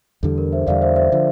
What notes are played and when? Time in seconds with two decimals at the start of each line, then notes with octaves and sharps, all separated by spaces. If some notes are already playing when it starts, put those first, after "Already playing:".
0.23 E2 D3 G3 A4
0.38 A#4
0.53 C5 E5
0.67 E2 D3 G3 D5 F5
0.82 C5 E5
0.96 C5 E5
1.12 D3 F3